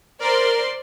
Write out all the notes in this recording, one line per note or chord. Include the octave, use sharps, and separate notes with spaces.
A#4 C5 D5 C6